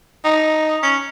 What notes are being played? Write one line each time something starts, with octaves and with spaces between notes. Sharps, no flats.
D#4
C#4